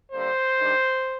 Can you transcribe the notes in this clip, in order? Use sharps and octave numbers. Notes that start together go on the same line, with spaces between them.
D3 G3 A#3 D4 C5
D#3 G3 D4